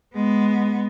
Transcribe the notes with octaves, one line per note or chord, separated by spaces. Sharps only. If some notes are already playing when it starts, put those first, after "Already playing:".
G#3 B3